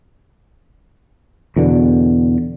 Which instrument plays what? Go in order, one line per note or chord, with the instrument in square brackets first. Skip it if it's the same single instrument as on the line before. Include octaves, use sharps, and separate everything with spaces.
[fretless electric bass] E2 B2 D3